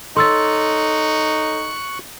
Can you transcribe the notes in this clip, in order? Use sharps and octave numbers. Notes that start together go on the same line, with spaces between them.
D#4 A4 C#5 C6 C#6 E6 F#6 A6